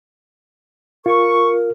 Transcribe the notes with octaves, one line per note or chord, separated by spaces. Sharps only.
F4 A#4 C#6